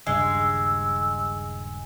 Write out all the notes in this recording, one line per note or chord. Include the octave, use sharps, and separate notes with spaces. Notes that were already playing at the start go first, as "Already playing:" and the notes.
D#1 G2 C#3 G#3 E6